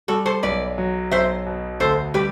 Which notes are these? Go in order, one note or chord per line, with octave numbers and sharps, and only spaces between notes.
G3 F#4 A4
A4 C5
B1 B4 D5
F#3
B1 C5 E5
B2
D2 A4 C5
G3 G4 B4